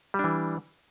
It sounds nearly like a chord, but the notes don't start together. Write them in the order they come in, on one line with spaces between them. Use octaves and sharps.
G3 D4 E3